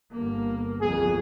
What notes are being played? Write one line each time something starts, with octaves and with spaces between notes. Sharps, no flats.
G1 A#3
G1 C2 F2 G#4